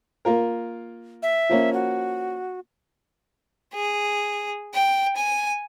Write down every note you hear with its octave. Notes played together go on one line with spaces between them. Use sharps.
A#3 F4 A#4
E5
F3 A#3 C#4
F#4
G#4
G5
G#5